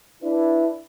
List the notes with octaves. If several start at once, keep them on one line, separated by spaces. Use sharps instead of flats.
D4 E4 B4